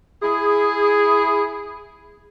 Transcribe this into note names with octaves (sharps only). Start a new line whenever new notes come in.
E4 G#4